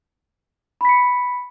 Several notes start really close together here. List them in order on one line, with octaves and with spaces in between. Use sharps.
B5 B6 C#7